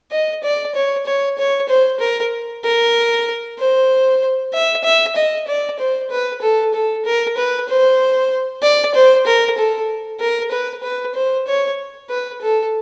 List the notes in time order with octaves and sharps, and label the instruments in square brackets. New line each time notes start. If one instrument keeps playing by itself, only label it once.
[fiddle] D#5
D5
C#5
C#5
C#5
C5
A#4
A#4
C5
E5
E5
D#5
D5
C5
B4
A4
A4
A#4
B4
C5
D5
C5
A#4
A4
A#4
B4
B4
C5
C#5
B4
A4